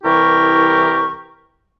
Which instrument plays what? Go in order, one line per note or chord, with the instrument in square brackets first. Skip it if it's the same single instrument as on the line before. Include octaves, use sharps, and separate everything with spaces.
[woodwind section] C2 E3 E4 G4 A#4 C#6